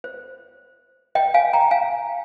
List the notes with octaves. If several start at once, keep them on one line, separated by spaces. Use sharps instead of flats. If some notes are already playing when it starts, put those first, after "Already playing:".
C5
D#5 G5
F5 G#5
G5 A#5
F5 G#5